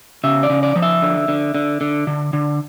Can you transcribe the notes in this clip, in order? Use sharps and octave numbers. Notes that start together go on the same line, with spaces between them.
C#3 E5
D5
C#3
D5
F3
E5
D3
D3
D3
D3
D3
D3